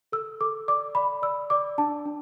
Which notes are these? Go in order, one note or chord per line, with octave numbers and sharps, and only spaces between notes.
A4 E6
A4 D6
D5 D6
D5 B5
D5 E6
D5 D6
D4 A5
D4